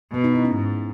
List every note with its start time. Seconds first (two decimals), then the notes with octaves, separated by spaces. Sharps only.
0.13 B2 B3
0.24 D#4
0.35 E4
0.45 C#4
0.55 G#2